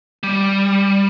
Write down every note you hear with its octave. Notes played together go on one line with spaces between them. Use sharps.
G3